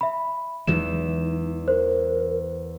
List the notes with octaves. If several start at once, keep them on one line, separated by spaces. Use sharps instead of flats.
E5 B5
E2 E3 F#3 G#3 D#4 E7
A#4 C5